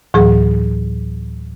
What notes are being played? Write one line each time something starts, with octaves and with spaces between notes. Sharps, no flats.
D2 A2 E3 F#3 G#4